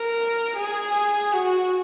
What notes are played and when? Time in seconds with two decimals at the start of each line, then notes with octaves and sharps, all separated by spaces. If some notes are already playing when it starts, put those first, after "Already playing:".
Already playing: A#4
0.57 G#4
1.33 F#4